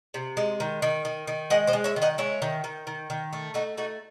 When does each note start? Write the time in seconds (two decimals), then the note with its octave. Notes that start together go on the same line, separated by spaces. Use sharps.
0.14 C3
0.37 G#3
0.60 D#3
0.82 D#3
1.05 D#3
1.27 D#3
1.50 G#3 D#5 F#5
1.67 C5 D#5
1.73 G#3
1.84 C#5 E5
1.96 D#3
2.02 D#5 F#5
2.18 G#3 C#5 E5
2.42 D#3
2.64 D#3
2.87 D#3
3.10 D#3
3.33 A3
3.54 A3 D#4 F#4
3.77 A3 D#4 F#4